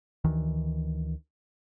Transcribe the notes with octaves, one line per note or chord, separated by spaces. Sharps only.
D2 D#3 E3